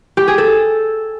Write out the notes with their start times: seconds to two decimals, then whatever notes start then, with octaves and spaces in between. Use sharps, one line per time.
0.17 G4
0.28 G#4
0.38 A4